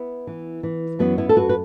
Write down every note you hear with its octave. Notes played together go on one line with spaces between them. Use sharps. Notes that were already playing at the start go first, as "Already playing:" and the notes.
Already playing: B3 E4
E3
E3
F#2 F#3 B3
B3 E4
A4
F#2 F#4 B4
B4